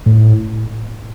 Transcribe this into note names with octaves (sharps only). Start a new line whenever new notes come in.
A2